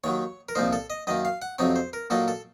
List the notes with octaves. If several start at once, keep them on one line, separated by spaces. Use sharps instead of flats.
D#2 D#3 F#3 C#5
A#4
C2 A#2 F3 A#3 D#4 C5
A4
D#5
F#2 D#3 A#3 D#5
F5
F#5
F2 C3 F#3 C4 D#4 C#5
C5
A#4
A#2 F#3 A#3 D#4 A4
A4